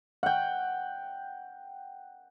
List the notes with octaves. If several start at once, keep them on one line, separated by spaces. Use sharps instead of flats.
F#5 G5